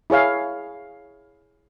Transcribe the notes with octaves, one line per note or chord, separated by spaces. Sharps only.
E4 G#4 C#5 F5